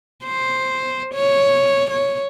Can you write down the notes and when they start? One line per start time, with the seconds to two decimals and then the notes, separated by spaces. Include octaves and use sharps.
0.24 C5
1.14 C#5
1.90 C#5